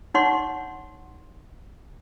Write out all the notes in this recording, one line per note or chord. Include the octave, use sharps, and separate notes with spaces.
D#4 C#5 F#5 C6 C#6